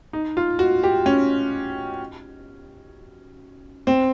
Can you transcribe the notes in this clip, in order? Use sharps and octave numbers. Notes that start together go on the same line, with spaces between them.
D#4
F4
F#4
G4
C#4
C4